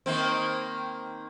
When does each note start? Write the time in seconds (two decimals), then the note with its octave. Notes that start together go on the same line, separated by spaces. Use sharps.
0.06 D#3 A#3 C4